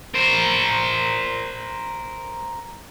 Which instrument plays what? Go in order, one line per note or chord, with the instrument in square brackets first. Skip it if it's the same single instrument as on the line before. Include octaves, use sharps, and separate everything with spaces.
[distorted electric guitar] A#4 C5